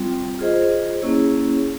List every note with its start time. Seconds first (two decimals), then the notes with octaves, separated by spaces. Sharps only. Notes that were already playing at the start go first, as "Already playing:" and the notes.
Already playing: G3 C4 F4
0.39 F4 G#4 C5 D#5
1.02 A#3 C#4 E4 G#4 C#5